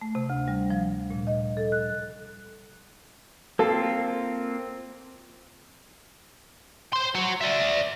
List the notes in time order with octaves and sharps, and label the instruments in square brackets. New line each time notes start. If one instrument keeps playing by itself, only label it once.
[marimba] A3
C3
D2
G3
F3
A#2
D#5
A4
F#6
[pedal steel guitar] A#3 C4 F4 [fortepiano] A4
[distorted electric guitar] C5 C6
F#4 C#5
D5 E5